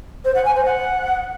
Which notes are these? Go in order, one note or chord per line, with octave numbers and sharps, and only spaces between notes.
C5
F#5
G#5
C5
F#5